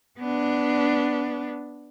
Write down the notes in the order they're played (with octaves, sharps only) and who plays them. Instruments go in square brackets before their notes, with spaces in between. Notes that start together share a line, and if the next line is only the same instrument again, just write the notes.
[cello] B3 D4